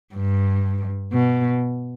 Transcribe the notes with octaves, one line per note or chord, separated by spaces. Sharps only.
G2
B2